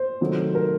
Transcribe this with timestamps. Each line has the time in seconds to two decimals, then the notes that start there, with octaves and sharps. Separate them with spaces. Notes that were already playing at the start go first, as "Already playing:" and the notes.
Already playing: C5
0.21 C3 D#3 F#3 A3
0.55 A#4